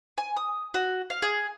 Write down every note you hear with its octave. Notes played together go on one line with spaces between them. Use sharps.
G#5
D#6
F#4
F5
G#4